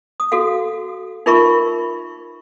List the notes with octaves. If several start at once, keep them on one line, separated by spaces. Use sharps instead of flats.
D#6
F#4 A4 F5
D#4 F4 A#4 E5 B5 C#6